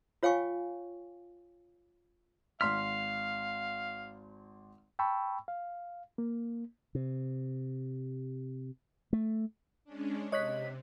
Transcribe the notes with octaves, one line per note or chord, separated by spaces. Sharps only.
F4 C#5 F5 G5 G#5 C#6
G#1 F5 C6 F6 B6
G5 A5 B5 C#6 E6
F5
A#3
C3
A3
G#3 C#4 D4
C3 C#5 D#5 F#6 B6